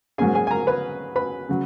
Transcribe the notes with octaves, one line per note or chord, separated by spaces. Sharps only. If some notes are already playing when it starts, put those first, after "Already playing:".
G#2 F#3 A#3 C#4 G#4 G#5
G#4 G#5
G#5
A#4 A#5
B4 B5
B4 B5
C#3 F#3